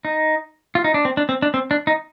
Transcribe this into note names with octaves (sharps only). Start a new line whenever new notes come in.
D#4
F4
D#4
D4
C4
D4
C4
D4
C4
D4
D#4